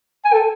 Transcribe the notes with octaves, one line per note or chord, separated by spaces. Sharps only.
G#5
A4